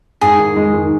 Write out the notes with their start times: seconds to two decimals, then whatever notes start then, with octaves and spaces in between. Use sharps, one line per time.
0.21 G#2 G#4
0.40 D#3
0.56 G#3
0.74 D#3